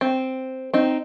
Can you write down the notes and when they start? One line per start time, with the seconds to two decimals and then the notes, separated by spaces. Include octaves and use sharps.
0.01 C4
0.74 C4 D#4